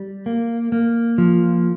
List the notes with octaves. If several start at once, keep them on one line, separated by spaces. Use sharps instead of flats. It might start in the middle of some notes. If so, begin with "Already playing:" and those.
Already playing: G3
A#3
A#3
F3